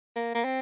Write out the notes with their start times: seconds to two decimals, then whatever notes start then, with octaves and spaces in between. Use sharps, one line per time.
0.16 A#3
0.35 A#3
0.45 C4